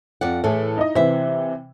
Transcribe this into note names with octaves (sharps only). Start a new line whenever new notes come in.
F2 D5 F#5
A2 E3 G#4 A4
D#4 E4 D#5
C3 E3 C5 E5